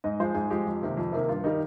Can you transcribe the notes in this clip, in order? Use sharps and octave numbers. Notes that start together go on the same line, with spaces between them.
G#2 D#5
F3 G#3 C5
G#2 G#4
F3 G#3 G4
F2
C3 D#3 A#3
F2
C3 D#3 A#3
G2 F4
D#3 G3 D#4